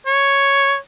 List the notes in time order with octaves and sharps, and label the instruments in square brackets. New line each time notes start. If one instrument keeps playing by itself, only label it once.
[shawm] C#5